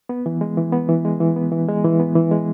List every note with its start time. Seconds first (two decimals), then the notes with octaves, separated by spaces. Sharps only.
0.09 B3
0.26 E3
0.41 G#3
0.57 E3
0.73 B3
0.89 E3
1.05 G#3
1.20 E3
1.36 B3
1.52 E3
1.68 G#3
1.84 E3
1.99 B3
2.15 E3
2.31 G#3